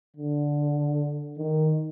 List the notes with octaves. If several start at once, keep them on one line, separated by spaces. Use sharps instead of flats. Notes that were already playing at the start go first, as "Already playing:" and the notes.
D3
D#3